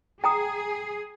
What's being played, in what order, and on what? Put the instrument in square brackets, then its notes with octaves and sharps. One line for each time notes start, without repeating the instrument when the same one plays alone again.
[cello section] G#4 [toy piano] G5 A#5 D#6